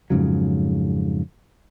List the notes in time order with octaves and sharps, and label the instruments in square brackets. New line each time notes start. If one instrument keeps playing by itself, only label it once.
[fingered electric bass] F2 G#2 C#3 F#3